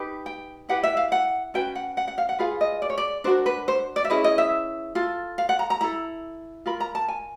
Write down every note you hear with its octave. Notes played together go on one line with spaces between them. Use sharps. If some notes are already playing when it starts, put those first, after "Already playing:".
Already playing: D#4 G4 B4
G5
E4 G4 B4 F#5
E5
F5
F#5
C#4 F#4 B4 G5
F#5
F#5
F#5
F5
F#5
F4 G#4 B4 F5
D#5
D5
C#5
D5
D4 F#4 A#4 C5
B4
C5
D5
E5
C#4 E4 G#4 B4 D#5
D#5
E5
F4 A4
F5
F#5
A#5
A#5
E4 A4 A#5
F4 A#4 B5
A#5
A5
G#5